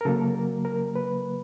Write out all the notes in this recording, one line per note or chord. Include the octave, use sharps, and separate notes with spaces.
A#4
C#3 F#3 A#3 A4
A#4
A#4
B4